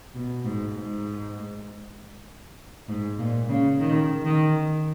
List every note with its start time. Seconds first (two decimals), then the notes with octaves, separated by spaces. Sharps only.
0.14 B2
0.45 G#2
0.75 G#2
2.88 G#2
3.18 A#2
3.49 C#3
3.79 D#3
4.25 D#3